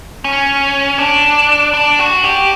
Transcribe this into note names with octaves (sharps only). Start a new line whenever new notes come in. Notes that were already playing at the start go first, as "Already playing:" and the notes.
C#4
D4
D4
F#4
G4